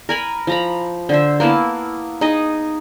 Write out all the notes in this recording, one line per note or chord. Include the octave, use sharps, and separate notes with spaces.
A#4 G#5 B5
F3 A#5 B5
D3 C5 E5
A#3 B3 E4 A5
D#4 G#4 D#5